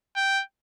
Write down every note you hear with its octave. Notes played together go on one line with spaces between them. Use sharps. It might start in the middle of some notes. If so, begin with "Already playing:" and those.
G5